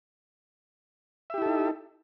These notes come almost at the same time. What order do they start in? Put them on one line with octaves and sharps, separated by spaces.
E5 G4 E4 A4 D#4